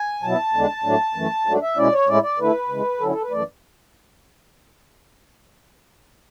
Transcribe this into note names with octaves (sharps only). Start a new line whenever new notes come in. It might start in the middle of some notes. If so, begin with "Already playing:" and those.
Already playing: G#5
B2 F#3 B3 E4 A5
E2 D3 G#3 D4
A2 F#3 A3 D4
F#2 E3 A3
G#2 F#3 A3 D4
E5
B2 G#3 C#4 E4 D5
C#5
A2 G#3 C#4 E4 D5
D5
D3 A3 E4 B4
C#3 E3 G#3
D3 F#3 C#4 E4 A4
A4
B4
F#2 E3 A3 D5